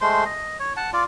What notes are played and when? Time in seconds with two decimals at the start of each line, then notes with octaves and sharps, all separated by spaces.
0.01 G#3 A3 C5 C6
0.25 D#5
0.59 C#5
0.77 F#5 A5
0.93 F4 D5